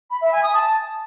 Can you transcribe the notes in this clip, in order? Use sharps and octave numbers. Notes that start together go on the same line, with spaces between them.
B5
E5
G#5
D#6
A5